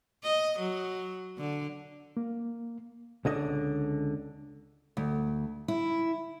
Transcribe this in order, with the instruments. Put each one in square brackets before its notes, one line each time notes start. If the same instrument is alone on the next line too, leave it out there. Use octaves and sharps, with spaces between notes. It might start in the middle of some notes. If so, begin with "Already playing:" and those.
[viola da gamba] D#5
F#3
D3
[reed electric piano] A#3
[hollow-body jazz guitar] C#2 D3 D#5
[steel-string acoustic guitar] D2
E4